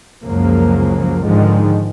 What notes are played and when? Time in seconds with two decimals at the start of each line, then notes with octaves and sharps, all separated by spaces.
0.24 C#2 F#2 C#3 F3 F#3 A#3
1.24 G#2 D3 D#3 F3 G#3